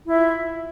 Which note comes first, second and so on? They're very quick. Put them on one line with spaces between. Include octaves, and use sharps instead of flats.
E4 E5 F4